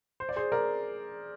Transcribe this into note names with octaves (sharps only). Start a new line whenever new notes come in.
C5
D5
G#4 C5
A#4 D5